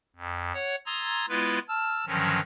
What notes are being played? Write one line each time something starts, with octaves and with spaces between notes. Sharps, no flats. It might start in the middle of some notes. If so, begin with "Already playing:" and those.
F2
C#5 F#5
A#5 C6 D#6 E6 G#6 A6
G#3 B3 E4 F4 B4
A5 E6 F6
G2 D3 D#3 F3 F#3 C#4